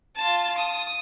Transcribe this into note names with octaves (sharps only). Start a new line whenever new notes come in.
F4 A5
D#6